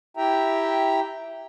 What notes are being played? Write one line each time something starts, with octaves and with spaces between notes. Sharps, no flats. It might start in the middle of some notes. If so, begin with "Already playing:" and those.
E4 G4 E5 G5 A#5